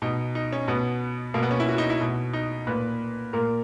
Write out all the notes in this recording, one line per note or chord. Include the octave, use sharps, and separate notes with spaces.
B2 D#4
D#4
C#4
B2 B3
B2 A#3
B3
C#4
E4
F#4
D#4
E4
B2
D#4
A#2 B4
A#2 A#4